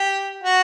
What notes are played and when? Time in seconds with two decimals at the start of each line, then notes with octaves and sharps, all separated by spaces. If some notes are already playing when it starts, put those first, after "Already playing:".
Already playing: G4
0.44 F#4